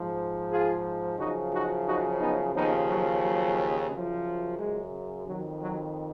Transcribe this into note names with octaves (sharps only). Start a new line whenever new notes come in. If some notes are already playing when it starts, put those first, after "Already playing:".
Already playing: G#2 F3
F4 G#4
F#2 C#3 F3 D#4 F#4
D#4 F#4
D#4 F#4
B3 D#4
D#2 C#3 F3 B3 D#4
F#3
F#3
F#2 C#3 F3
F3 G#3
F2 D#3 F#3
F#3